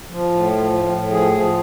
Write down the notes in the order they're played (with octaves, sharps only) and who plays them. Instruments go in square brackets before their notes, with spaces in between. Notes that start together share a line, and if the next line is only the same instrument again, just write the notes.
[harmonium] F3
A2
F3
A2
A2
F3 G#4
F3